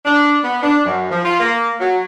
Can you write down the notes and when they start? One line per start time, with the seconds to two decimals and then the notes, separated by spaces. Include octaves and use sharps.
0.05 D4
0.44 B3
0.63 D4
0.86 F#2
1.11 F3
1.25 F4
1.40 A#3
1.80 F#3